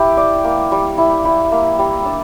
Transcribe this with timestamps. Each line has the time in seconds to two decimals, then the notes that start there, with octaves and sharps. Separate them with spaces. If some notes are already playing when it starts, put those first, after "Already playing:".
Already playing: E4 G4
0.17 D5
0.44 A#3
0.72 G3
0.98 E4
1.25 E4
1.52 A#3
1.79 G3
2.06 D4